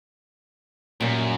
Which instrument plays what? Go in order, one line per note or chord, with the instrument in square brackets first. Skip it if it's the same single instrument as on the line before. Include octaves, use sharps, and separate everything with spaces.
[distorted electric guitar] F#2 [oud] A#2 G3